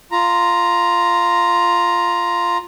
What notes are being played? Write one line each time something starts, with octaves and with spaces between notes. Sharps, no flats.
F4 A#5